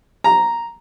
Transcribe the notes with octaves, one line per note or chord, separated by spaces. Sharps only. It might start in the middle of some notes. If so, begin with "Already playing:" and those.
A#5